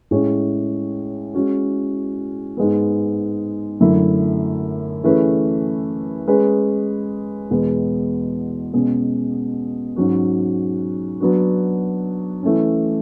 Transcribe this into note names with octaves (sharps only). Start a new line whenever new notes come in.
A2 G#3 C#4 G#4 C#5
G#3 C#4 F#4
G#2 G#3 B3
F#2 D3 F#3 A3 E4
E3 A3 C#4 G#4 B4
G#3 C#4 G#4 B4
E2 B2 G#3 B3
B2 G#3 C#4 G#4
G#2 F#3 C#4 F#4
F#3 B3 D4 F#4
E3 A3 C#4